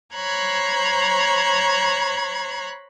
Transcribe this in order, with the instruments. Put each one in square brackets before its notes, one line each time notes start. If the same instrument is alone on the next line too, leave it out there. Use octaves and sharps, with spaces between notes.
[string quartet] C5 C#5 A#5 B5 F#6 G#6